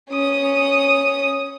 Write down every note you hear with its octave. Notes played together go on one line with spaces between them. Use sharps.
C#4 D#6